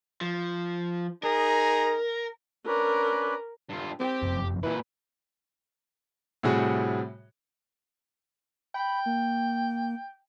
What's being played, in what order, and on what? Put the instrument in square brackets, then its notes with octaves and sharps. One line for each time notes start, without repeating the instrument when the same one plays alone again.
[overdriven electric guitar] F3
[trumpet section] D#4 G#4 A#5 [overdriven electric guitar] A#4
[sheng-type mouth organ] C#4 D4 B4 [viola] A#4
[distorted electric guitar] G2 F4
[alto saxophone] C4 [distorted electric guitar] G4 G5
[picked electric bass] F#1 F2
[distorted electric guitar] A#2 B4 [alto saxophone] E3
[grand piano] A2 C3 G3 F#4 G#4
[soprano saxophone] G5 [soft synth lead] B5
[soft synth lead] A#3